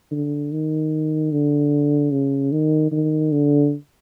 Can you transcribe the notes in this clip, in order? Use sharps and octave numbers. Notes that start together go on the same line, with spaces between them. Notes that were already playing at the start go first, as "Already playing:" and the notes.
D3
D#3
D3
C#3
D#3
D#3
D3